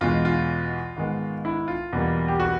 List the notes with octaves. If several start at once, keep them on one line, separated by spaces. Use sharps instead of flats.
E2 B2 G#3 F4
F4
G#2 D#3 G#3 B3
E4
F4
E2 B2 G3 A#3
G4
F#4